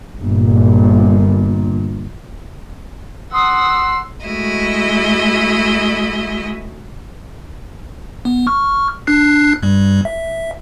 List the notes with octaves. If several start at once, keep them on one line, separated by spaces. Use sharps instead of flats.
G1 A#2
F#5 C6 D#6 E6
G#3 A3 E4 F#4 D#5 E5
B3
C#6 F6
D4 F#6 C7
G2 G3
E5